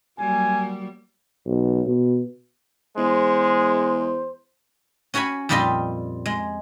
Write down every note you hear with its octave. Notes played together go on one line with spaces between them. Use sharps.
F#3 G3 A#3 G#5
B1
B2
E2 G#3 C5
C#4 F#4 C#5 G#5 B5
F2 A#2 G3 F4 D#5 C6
G#3